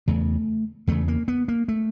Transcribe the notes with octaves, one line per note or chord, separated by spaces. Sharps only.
E2 C#3 A3
E2 C#3 A3
A#3
B3
A#3
A3